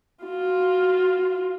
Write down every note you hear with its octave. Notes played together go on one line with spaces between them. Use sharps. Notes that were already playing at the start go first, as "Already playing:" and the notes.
F4 F#4